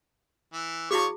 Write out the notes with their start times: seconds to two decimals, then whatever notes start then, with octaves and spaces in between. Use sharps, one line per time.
0.53 E3
0.91 F3 E4 F#4 G#4 C#5 C#6